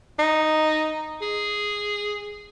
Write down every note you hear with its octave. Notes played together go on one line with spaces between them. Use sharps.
D#4
G#4